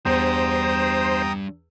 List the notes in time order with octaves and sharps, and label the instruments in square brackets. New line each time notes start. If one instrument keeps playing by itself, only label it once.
[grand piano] E2 [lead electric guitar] G3 D4 [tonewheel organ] C5 [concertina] G5 A#5 D#6